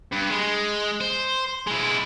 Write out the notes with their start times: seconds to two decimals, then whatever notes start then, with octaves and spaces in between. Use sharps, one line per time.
0.12 G2
0.30 G#3
1.01 C5
1.67 G#3 E4